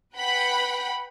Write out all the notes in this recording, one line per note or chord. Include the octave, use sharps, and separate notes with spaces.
B4 F#5 G5 B5